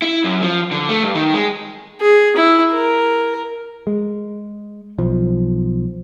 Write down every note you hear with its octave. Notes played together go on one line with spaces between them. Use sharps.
E4
F#2
F3
D3
A3
G2
D#3
G#3
G#4
E4
A#4
G#3
B1 F3